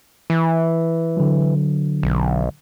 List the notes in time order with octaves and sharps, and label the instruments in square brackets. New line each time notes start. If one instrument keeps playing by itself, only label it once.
[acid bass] E3
[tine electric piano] D3 F#3
[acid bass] B1